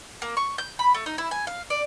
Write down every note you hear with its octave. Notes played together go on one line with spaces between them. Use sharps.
A#3
C#6
G6
B5
A3
D#4
E4
G#5
F5
D5